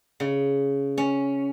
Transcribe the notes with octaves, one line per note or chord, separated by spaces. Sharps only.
C#3
C#4